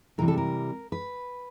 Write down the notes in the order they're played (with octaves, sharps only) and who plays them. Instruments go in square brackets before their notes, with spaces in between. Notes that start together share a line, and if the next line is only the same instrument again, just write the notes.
[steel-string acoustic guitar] C3 E3 G3 A#4
A4
A#4
B4